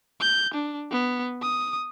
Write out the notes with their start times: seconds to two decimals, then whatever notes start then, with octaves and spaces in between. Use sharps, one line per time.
0.21 G6
0.54 D4
0.91 B3
1.42 D#6